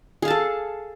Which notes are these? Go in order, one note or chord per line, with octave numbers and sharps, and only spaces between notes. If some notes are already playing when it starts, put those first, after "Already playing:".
G#4 A4 F5 A5